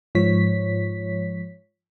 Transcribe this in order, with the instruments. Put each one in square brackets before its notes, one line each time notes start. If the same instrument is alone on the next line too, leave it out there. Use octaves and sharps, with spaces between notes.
[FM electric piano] G#2 F3 C#5 B6